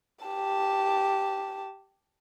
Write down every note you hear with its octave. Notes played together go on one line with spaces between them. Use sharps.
G4 A5